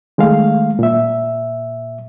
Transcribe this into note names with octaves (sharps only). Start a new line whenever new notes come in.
D#3 G#3 A3 F5
A#2 E5